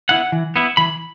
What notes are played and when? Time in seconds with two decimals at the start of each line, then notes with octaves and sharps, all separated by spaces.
0.09 B3 E4 F#5
0.32 E3
0.56 B3 E4
0.77 E3 B5